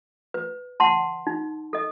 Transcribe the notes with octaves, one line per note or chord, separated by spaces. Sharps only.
B4
F#5 A5 C6
D#4
A4 D#5